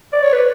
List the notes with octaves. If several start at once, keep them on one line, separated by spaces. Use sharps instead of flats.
D5
C#5
B4